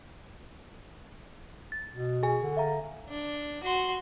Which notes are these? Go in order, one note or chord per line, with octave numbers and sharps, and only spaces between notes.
A6
B2
G#4 G#5
D3
E5 F5 A#5
D4
F#4 C6